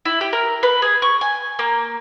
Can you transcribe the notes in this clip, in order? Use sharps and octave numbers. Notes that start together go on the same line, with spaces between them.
E4
G4
A#4
B4
G#4
C#6
G#5
A#3